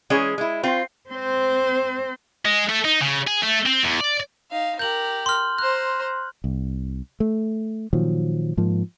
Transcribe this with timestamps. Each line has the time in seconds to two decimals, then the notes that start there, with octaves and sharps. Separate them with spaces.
0.10 E3 G#3 C#4 G#4
0.38 G#3 E4
0.63 C4 F4
1.10 C4 C5
2.45 G#3
2.69 A3
2.85 D#4
3.02 C#3
3.27 G#4
3.42 A3
3.66 C4
3.83 E2
4.01 D5
4.51 D#4 F5
4.79 G4 A#4 G6 F#7
5.26 C6 F6
5.59 C5 A#5 F#6
6.44 C2
7.20 A3
7.93 A#2 D#3 F3 F#3
8.57 G#2 F3 A#3